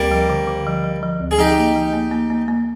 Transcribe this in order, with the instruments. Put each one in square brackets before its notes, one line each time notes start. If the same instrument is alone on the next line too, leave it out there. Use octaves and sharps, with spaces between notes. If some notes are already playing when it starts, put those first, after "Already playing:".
Already playing: [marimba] D2 [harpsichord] G3 A#3
[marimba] F3
D3
D3
F3
F3
F3
D2
[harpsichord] G#4
[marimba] F3 [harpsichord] D#4 G4
[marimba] A#3
F3
A#3
A#3
A#3
A#3